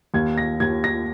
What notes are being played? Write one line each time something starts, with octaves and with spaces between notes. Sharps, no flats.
D#2 G#6
A#6
D#2 G#6
A#6